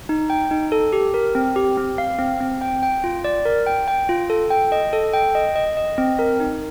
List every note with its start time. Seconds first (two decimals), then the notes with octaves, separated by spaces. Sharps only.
0.09 D#4
0.30 G5
0.51 D#4
0.72 A4
0.93 G4
1.14 A#4
1.35 C4
1.56 G4
1.77 C4
1.98 F5
2.19 C4
2.40 C4
2.61 G5
2.83 G5
3.04 F4
3.24 D5
3.45 A#4
3.66 G5
3.88 G5
4.09 F4
4.30 A4
4.50 G5
4.72 D#5
4.93 A4
5.14 G5
5.35 D#5
5.56 D#5
5.77 D#5
5.98 C4
6.19 A#4
6.40 D#4